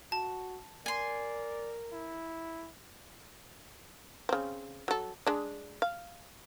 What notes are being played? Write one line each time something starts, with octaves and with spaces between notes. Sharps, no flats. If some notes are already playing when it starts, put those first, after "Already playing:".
F#4 A5
A#4 D5 G#5 C6
E4
C#3 C4
F#3 A4
G#3 D4
F5